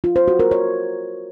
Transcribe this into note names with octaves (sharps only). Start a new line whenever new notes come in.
F4
C5
F#4
A#4
C#5